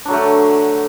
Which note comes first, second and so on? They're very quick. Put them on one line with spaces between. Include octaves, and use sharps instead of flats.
D4 F#3 D3 A3